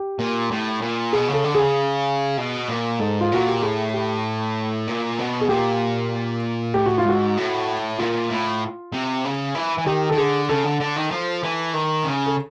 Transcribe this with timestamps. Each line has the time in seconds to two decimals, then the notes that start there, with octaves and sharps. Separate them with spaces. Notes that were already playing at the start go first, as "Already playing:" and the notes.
Already playing: G4
0.19 A#2
0.51 A2
0.82 A#2
1.13 B2 G#4
1.28 C#3
1.33 A4
1.44 D3
1.55 C#3 G#4
2.38 B2
2.69 A#2
3.00 G#2 A4
3.21 F4
3.32 A#2 F#4
3.48 G4
3.62 A2 G#4
3.94 G4
4.87 A#2
5.19 B2
5.41 G#4
5.49 A#2 G4
6.74 A2 G4
6.86 F#4
6.98 F4
7.05 G#2 F#4
7.37 A2
7.99 A#2 F4
8.30 A2
8.92 C3
9.25 C#3
9.55 E3
9.78 E3
9.86 D#3 G4
10.10 D#3 A4
10.18 D3 G#4
10.49 C#3 A4
10.64 D3
10.80 D3
10.96 D#3
11.11 F3
11.43 E3
11.73 D#3
12.05 C#3
12.26 A4